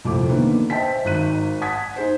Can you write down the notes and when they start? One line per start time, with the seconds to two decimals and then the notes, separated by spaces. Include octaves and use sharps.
0.05 C2 F2 A3 D6
0.30 D3 D#3 A#3 B3
0.70 C5 D#5 E5 G5 A5 B6
1.05 G#1 D#4 F#6 D#7
1.61 F#5 A5 D#6 F#6 G#6 B6
1.96 D#4 G#4 C5